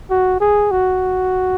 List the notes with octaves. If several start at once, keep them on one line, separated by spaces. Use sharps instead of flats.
F#4
G#4
F#4